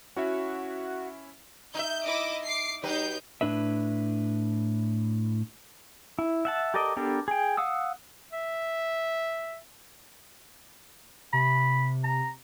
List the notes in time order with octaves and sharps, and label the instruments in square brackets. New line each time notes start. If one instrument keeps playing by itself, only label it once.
[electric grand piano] C#4 E4 E5 [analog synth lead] F#4
[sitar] D#4 E5 [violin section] G6
[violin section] E4 D#5 D6
D6 C7
[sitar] F#3 G4 B4 [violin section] D#4 G6
[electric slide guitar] A2 D4 B4 E5
[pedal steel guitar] E4
E5 F#5 A5
G4 A4 A#4 D5 D#5
B3 D4 G4 A4 A#4
G#4 G5
F5 F#5 D#6 E6
[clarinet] E5
[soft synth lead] C3 [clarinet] B5
[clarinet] A#5